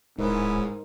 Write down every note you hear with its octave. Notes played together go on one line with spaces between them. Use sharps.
D1 G#2 E3 B3 C#4 D#4 A#4 C5